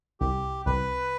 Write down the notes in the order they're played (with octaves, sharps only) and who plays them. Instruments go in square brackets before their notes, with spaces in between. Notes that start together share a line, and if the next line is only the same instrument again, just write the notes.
[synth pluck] C2 [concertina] G4
[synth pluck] C2 [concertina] B4